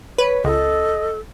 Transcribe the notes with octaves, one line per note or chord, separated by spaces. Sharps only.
B4 C#5
C#2 A4 D#5